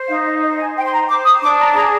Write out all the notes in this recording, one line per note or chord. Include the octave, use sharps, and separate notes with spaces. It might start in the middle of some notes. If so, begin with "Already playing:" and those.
Already playing: C5
D#4 F5
D#5
C5 D#5
G#5
C5 G5
C6
A#5
C5 D6
D#6
D4 D6
A#5
G#4 A#5